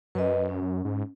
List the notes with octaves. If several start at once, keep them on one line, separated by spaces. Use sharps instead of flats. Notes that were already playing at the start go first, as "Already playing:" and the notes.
F#2 B4 D#5
C#4
F#2
G#2